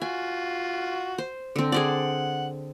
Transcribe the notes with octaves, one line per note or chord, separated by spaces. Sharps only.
F4 F#4 G#5
C5
D3 C4
G#4 C5 D5 F#5